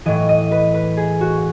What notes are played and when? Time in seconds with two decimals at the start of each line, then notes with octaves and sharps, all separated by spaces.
0.05 A2 E3 D#5
0.29 D#5
0.51 B4
0.74 B4
0.97 G#4
1.21 F#4